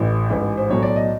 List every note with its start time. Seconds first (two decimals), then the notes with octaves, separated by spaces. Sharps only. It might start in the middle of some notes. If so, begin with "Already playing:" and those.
Already playing: A1 A2 E3
0.28 A1 G#2 E3 G#3
0.57 C5
0.69 B1 A2 F#3 C#5
0.83 D5
0.96 D#5